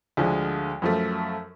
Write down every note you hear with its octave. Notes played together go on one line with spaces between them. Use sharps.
D2 D3 F3 G#3
F#2 F3 A3